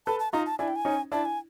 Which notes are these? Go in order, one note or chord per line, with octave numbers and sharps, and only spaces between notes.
A4 B4 A5
A5
D#4 F4 A#5
A5
D4 E4 G#5
G5
G#5
C#4 D#4
D4 E4 A5
G#5